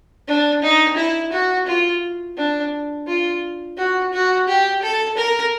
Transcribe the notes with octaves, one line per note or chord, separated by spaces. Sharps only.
D4
D#4
E4
F#4
F4
D4
F4
F#4
F#4
G4
A4
A#4